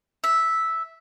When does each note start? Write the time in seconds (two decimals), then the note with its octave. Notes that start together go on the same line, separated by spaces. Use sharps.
0.24 E5